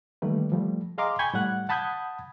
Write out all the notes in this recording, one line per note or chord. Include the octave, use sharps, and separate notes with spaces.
D#3 E3 G3 A3 A#3 B4
F3 G3 A3
G#4 D#5 F5 A#5 C6 D6
G5 G#5 B5 C#6 G6 G#6
A2 G3 F#5 F#6
F#5 A5 B5 D#6 G6 G#6